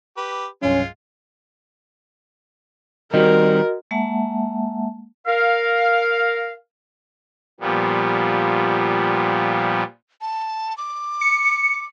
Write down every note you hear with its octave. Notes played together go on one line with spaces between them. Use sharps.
G4 B4
C2 G2 F#3 G#3 C#4 F4
D#3 G3 C4 F#4 A#4 D#5
G#3 A#3 E5 F#5 A5
A#4 F5
A#2 F3 G3 B3
A5
D6
C#7